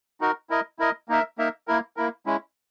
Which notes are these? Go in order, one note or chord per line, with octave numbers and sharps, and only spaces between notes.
D#4 F#4 A#4
E4 A#4 D#5
E4 A#4 D#5
A#3 D#4 A#4 E5
A#3 D#4 A#4 E5
A#3 E4 A#4
A#3 E4 A#4
G#3 C#4 E4